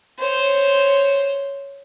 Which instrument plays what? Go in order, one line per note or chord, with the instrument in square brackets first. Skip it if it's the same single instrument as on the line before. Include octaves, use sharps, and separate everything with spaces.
[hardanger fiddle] C5 C#5